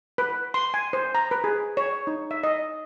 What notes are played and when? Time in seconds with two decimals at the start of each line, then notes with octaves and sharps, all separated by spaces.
0.18 B4
0.54 C6
0.74 G#5
0.93 C5
1.15 A#5
1.31 B4
1.44 G#4
1.77 C#5
2.07 D#4
2.31 E5
2.43 D#5